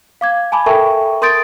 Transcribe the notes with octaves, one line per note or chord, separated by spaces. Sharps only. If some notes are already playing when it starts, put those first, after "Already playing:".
F5 D6 G#6
G#5 A5 B5 D6
A4 A#4 E5 G5 A5 C#6
A#4 C6 D#6 G6 A6 D7